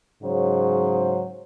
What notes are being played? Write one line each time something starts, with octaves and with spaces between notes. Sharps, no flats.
G#2 C#3 F#3 C5